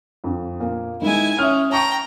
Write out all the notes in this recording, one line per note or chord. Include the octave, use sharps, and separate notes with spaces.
F2 D3
A#2 A#3
D#3 G#3 E4 G#5
C#4 E5 D#6 F6
G5 A5 A#5 C#6 F7